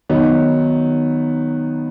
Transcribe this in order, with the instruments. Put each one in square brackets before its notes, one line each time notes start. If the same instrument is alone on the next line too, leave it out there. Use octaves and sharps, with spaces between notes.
[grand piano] D#3 F#3 B3 D#4